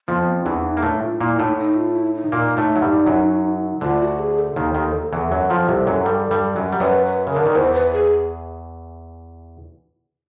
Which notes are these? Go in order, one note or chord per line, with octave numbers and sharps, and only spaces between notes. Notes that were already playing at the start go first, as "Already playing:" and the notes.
F2 F3 B3
C4
E2 E3 D4
D4
D#4
A#3
A2 A3 D4
F4
A#2 A#3 E4
A2 A3 D#4
D#4
F4
E4
D#4
A#2 A#3
A2 A3
F#3
G2 G3
F#2 F#3
D2 D3 F4
F#4
G#4
A4
D#2 D#3
D#2 D#3
E2 E3
F#2 F#3 A4
F2 F3
C2 C3
F#2 F#3
G2 G3
G2 G3
F#2 F#3
G3
F#2 F#3 B4
B4
C#3 A#4
D3
D#3
E2 E3 C5
B4
G#4